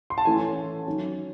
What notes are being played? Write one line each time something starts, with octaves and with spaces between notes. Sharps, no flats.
C6
A5
A2 E3 A3 C#4 G#5
D#3 F#3 C#4